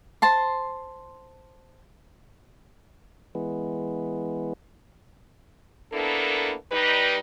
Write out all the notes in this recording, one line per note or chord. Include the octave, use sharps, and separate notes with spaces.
C5 A5 C6
E3 G#3 B3
A#3 B3 D4 E4 A4 A#4
G3 D#4 B4